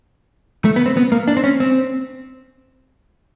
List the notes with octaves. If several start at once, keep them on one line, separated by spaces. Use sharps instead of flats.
A3
B3
C4
B3
A#3
D4
C4
C#4
C4